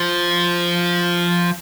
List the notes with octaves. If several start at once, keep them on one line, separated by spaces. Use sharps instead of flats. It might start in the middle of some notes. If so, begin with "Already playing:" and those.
Already playing: F3